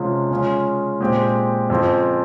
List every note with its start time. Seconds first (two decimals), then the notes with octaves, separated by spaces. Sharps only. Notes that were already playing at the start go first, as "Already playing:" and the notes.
Already playing: C3 F3 G#3 C#4 F4
0.31 C#3 G#3 C#4 F4
1.01 A#2 G#3 C4 G4
1.70 F2 C#3 F3 C4